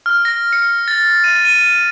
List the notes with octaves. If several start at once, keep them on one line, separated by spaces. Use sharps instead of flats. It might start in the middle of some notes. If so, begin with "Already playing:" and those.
F6
A#6
C#7
A6
D#7
D#7